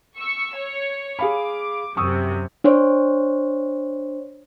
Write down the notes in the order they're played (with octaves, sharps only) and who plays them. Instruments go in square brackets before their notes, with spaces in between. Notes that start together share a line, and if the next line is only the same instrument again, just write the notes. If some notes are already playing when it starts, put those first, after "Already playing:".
[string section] C#6 E6
C#5
[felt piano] G#4 F5 B5 [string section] D6
[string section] F#2 C3 [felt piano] C#6 D#6 E6
[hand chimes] D4 C5 C#5